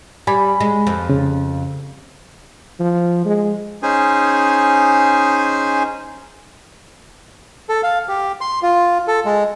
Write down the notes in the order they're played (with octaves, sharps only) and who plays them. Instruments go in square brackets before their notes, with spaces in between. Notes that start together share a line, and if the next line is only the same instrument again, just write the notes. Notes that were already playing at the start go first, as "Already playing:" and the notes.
[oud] G3 [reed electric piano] G#5 B5
[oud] G#3
F2
[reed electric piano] C#3
[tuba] F3
G#3
[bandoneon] C#4 D#4 G#4 C5 G#5
A4
F5
G4
C6
F4
A4
G#3